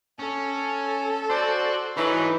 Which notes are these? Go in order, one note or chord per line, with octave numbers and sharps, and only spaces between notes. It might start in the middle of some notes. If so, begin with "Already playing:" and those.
C#4 A4
F#4 C5 D5
E3 F#3 D#4 G#4 B4